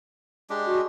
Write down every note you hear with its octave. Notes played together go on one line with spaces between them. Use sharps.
G#3 D4 G4
F#4